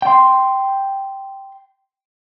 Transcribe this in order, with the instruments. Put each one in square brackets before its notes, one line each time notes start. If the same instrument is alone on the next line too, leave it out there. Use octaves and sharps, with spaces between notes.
[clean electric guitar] G5 C6